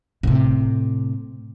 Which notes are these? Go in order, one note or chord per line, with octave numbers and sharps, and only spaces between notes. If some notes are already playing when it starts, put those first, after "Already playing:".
A2 C3